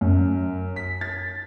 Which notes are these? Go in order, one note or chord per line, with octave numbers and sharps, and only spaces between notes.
F#2
B6
A6